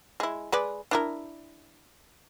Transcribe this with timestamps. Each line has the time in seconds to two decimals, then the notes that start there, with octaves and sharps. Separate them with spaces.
0.20 G#3 E4
0.52 G#3 B4 D5
0.91 D4 E4 A#4